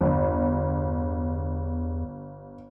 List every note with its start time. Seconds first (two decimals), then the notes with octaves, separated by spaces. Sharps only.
0.01 G1 E2